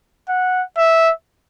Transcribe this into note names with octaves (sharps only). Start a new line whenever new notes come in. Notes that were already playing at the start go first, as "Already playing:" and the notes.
F#5
E5